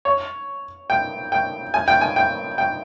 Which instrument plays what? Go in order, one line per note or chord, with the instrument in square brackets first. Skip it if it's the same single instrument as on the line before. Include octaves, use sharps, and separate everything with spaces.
[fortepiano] C#5
G5
G5
G#5
G5
G#5
G5
G5